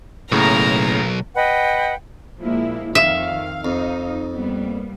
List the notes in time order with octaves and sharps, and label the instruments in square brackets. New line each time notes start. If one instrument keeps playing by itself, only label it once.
[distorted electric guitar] B1 [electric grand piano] A2 C#3 A#3 [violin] A#4 A#5
[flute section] B4 D#5 F#5 G5
[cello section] A#2 E4 [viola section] F3 G#3 A#3
[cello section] F2 D#3 [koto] E5 [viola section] F5
[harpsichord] F2 [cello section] D#4
[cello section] G3 A#3 [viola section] B3